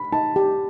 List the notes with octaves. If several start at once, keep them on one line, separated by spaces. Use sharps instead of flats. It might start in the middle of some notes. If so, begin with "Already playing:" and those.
Already playing: B5
D#4 A5
G4